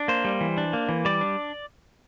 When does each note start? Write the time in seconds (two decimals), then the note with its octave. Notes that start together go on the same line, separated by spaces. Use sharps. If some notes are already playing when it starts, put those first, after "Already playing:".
Already playing: D4
0.08 A#3 C5
0.25 G3
0.41 E3
0.58 D4
0.73 A#3
0.89 E3
1.05 G3 D5
1.21 D4